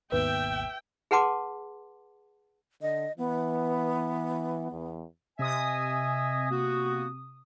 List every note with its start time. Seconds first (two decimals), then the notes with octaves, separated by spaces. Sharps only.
0.12 G#1 D#2 B2 B4 E5 G5
1.11 G#4 B4 F#5 A5 C6 D6
2.82 D3 D#5
3.18 E3 B3
4.71 E2
5.39 C3 D#5 E5 G#5 D#6
6.50 A#3 B3 F#4